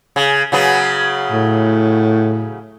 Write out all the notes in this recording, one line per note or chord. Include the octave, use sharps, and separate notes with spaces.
C#3
C#3 F#3 B3
A2